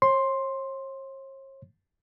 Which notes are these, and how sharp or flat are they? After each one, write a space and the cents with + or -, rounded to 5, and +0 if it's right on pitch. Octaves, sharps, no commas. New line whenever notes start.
C#5 -45 C6 +5